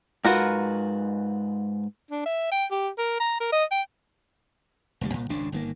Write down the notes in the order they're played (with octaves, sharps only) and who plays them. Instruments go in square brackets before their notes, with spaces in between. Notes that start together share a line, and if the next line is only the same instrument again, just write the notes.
[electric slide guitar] G#2 B4 [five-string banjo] F4 F#4 A#4
[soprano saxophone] D4
E5
G5
G4
A#4
A#5
A#4
D#5
G5
[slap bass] F1 D2 G3
C2 A#2
G#1 C#2 C#3 D4
G1 D#3 A#3